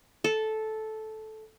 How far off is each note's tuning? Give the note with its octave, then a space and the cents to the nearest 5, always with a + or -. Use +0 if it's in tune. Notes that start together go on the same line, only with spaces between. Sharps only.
A4 -10